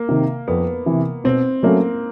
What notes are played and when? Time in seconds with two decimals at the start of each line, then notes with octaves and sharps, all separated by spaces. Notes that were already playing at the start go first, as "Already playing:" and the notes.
Already playing: A#3
0.09 C3 D#3
0.48 F2 B3
0.86 C3 E3
1.24 B2 C4
1.63 F#3 A3 A#3 C#4